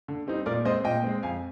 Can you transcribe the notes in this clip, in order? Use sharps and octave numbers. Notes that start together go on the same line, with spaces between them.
D3
G3 C4 D#4
A#2 A#4 D5
G#3 C4 C5 D#5
A#2 D#5 G5
G#3 C4
F2 F5 G#5